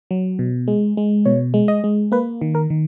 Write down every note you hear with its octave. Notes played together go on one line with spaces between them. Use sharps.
F#3
B2
G#3
G#3
B2 C#5
G#3
D#5
G#3
A#3 B4
D#3
A#4
D#3